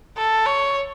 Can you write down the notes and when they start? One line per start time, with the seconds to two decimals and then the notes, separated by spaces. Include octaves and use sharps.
0.17 A4
0.46 C#5